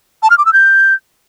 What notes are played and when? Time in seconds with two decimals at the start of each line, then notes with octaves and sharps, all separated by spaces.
0.23 A5
0.30 F6
0.38 D6
0.46 E6
0.53 G6